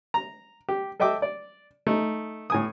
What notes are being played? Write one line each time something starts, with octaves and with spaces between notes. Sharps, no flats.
A#5
G4
A4 D#5 E5 G5 D6
D5
A3 D#4
A2 G#5 D#6